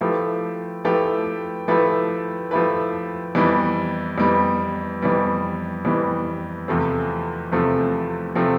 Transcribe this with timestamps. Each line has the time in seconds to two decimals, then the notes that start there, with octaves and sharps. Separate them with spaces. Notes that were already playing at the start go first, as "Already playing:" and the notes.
0.01 F3 A3 E4 G4 B4
0.85 F3 A3 E4 G4 B4
1.68 F3 A3 E4 G4 B4
2.51 F3 A3 E4 G4 B4
3.35 F2 E3 G3 B3
4.18 F2 E3 G3 B3
5.02 F2 E3 G3 B3
5.85 F2 E3 G3 B3
6.68 E2 C3 F3 A3 C4
7.52 E2 C3 F3 A3 C4
8.35 C3 F3 A3 C4